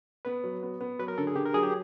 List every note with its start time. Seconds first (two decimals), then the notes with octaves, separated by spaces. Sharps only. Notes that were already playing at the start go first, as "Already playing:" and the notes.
0.25 B3 B4
0.44 F#3
0.63 B3
0.81 B3
0.99 F#3 B4
1.08 A#4
1.18 D3 A4
1.27 G#4
1.35 D3 G4
1.46 A#4
1.54 F#3 G#4
1.63 G4